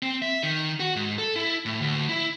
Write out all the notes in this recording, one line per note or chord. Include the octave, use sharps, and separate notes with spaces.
C4
E5
D#3
F#4
G#2
A4
E4
A2
D2
E4